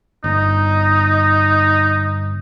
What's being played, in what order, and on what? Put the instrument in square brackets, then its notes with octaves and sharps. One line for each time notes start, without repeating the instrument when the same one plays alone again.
[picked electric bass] G1 [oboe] D#4